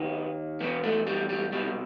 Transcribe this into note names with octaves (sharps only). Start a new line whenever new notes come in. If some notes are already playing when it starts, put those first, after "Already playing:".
Already playing: D#2 D#3 B3
E2 B2 B3
A3
G3
G3
C2 B2 G3